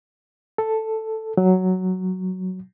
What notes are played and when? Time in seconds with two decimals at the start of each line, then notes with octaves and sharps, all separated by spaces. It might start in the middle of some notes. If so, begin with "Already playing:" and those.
0.58 A4
1.37 F#3